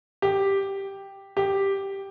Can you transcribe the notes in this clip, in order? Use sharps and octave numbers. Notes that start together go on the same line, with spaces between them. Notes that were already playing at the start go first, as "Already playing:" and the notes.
G4
G4